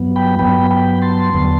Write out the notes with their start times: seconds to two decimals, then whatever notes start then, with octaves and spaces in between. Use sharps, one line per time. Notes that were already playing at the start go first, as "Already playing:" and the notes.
Already playing: G2 F#3 B3
0.16 G5 B5
0.39 G2 F#3 B3 G5 B5
0.71 G5 B5
1.02 A5 C6
1.33 E2 D3 F#3 B3